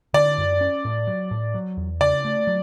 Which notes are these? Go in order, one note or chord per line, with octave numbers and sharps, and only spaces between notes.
D3 D5
F#2
C#4
A2
F#3
A2
F#3
E2
C#3 D5
A3
F#3